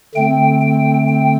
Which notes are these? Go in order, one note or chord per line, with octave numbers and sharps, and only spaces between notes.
D3 A3 C4 G5
G5
G5